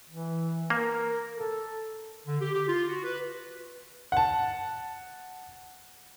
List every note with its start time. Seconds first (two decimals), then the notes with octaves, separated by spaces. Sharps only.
0.09 E3
0.70 A#3 A#4
1.36 A4
2.26 D3
2.41 G4
2.53 G4
2.68 F4
2.88 F#4
3.04 B4
4.12 F#5 A5